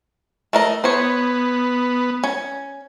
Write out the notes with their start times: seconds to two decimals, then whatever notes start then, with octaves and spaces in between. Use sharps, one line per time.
0.53 A3 A#4 D#5
0.84 B3 C5 C#5
2.24 C#4